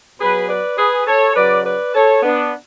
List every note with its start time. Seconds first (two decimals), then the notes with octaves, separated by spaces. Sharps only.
0.19 B2 F#3 G#4 B4
0.48 B4 D5
0.78 G#4 B4
1.06 A4 C#5
1.35 C#3 F#3 B4 D5
1.65 B4 D5
1.95 A4 C#5
2.23 B3 D4